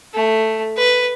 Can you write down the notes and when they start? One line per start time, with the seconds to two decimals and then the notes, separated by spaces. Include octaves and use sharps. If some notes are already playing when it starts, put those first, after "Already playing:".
0.14 A3
0.77 B4